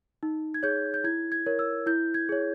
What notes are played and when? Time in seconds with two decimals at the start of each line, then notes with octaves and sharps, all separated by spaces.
0.23 D#4
0.54 G#6
0.63 G#4 C#5 G6
0.94 G6
1.04 E4 G#6
1.32 G#6
1.46 A#4 C#5
1.59 E6
1.86 E4 G6
2.14 G#6
2.29 G#4 C#5